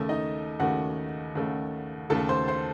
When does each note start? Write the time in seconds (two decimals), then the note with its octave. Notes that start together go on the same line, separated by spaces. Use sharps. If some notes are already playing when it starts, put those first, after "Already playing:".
Already playing: D#2 C#3 A3
0.09 D#4 D#5
0.59 D#2 C#3 A3 F#4 F#5
1.35 D#2 C#3 A3
2.10 D#2 C#3 A3 A4 A5
2.29 C5 C6
2.48 C5 C6